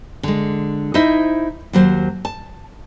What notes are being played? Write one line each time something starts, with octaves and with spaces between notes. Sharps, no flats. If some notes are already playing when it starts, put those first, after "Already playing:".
D3 G#3
D#4 E4 C5 D#5 E5
D#2 F#3 C5
A5